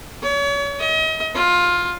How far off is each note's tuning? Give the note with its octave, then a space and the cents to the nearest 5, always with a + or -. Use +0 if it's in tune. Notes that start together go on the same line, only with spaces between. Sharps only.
C#5 +35
D#5 +40
F4 +15